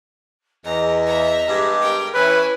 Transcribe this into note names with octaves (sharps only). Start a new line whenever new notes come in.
E2 D#5 A#5
E5 A#5
G2 G#3 G4
A#4 G5
E3 C#4 E4 B4 G#5